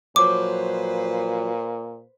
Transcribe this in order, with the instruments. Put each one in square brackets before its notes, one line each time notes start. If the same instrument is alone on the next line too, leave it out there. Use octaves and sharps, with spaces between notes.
[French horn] A#2 [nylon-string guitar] F3 F#3 [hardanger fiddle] B4 C5 [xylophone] D6